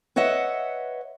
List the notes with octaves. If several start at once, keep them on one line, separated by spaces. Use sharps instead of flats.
B4 C#5 D#5 E5 F#5